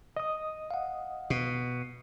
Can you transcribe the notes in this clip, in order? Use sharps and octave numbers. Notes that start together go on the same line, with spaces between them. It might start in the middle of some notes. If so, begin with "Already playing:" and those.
D#5 D#6
F5 F#5
B2